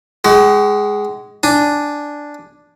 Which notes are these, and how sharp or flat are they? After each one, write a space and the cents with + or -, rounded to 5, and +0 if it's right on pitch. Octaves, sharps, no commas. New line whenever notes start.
G#3 +0 F#4 +40
D4 +0 G#5 +0